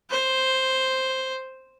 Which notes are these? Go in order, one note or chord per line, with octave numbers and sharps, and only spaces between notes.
C5